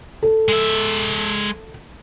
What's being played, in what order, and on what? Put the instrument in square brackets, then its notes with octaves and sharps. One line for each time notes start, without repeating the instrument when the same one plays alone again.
[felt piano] A4
[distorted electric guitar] G#3 E5